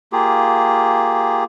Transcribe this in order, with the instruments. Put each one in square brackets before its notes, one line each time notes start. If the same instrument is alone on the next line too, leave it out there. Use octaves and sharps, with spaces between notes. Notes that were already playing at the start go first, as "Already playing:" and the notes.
[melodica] A#3 F4 G4 G#4